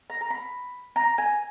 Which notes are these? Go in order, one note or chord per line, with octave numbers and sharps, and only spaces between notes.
A#5
A#5
B5
A#5
G#5